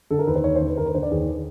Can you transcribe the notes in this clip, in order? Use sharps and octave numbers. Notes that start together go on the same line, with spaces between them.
D3 A4
A#4
D#2 B4
C5
D#2 C#5
C5
D3
B4
D#2 A#4
B4
D3 C5
D5
D#2 G#4